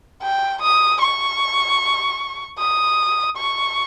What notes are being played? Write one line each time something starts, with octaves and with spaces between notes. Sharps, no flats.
G5
D#6
C#6
D#6
C#6